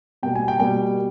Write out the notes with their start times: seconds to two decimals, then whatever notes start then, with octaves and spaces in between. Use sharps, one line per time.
0.23 B2 G3 A#3 G5
0.35 G#5
0.48 G5
0.60 B2 G3 A#3 G5